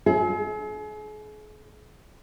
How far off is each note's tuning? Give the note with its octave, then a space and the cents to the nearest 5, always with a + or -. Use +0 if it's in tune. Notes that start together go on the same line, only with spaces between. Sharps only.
G#4 +40 E5 -35